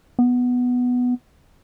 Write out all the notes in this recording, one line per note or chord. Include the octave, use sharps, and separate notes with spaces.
B3